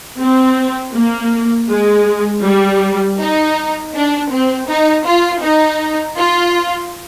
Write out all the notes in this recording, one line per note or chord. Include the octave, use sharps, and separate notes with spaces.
C4
A#3
G#3
G3
D#4
D4
C4
D#4
F4
D#4
F4